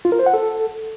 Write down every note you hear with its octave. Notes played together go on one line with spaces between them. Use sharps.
F4
A#4
C5
F#5
A4